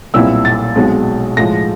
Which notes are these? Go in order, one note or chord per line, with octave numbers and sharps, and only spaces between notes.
B1 A#2 G3 C4 E4 E6
A6
B1 B2 G#3 C4
A2 F3 G#3 A#6